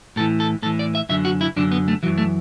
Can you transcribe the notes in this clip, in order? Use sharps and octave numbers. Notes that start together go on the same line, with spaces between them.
A2 E3 A4
A4
A2 E3 A4
D5
E5
F#2 D3 E5
F#4
E4
F#2 D3 D4
B3
A3
F#2 E3 F#3
A3